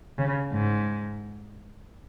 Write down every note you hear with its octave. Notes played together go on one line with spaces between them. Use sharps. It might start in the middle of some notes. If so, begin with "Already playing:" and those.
C#3
G#2